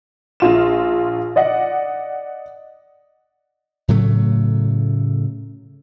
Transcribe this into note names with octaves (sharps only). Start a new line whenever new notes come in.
A#1 F4 E7
D5 D#5 F#5
A2 C#3 F#3 A3